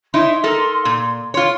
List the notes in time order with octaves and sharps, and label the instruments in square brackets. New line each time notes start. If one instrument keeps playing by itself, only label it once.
[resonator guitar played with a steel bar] D#4 E4 C#5 [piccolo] C6
[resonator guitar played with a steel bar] D#4 A4 A#4
A#2
[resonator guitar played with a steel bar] F4 C#5 [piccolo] C6